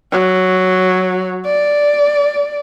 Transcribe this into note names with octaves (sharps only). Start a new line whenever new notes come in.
F#3
D5